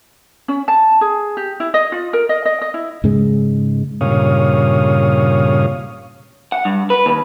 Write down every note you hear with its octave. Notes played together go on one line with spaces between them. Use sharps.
C#4
A5
G#4
G4
E4
D#5
F4
A#4
D#5
D#5
D#5
E4
G#2 C#3 G#3
G2 A#2 C#3 C#5 F5 D#6
F#5
G2
B4
D#2